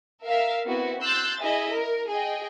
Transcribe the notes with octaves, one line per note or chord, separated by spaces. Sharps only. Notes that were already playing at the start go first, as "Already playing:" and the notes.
A#4 E5 F5
B3 C4 E4 F#4
C6 E6 F#6 G6 A6
E4 G#4 D#5 E5
A#4
G#4 D#5 G5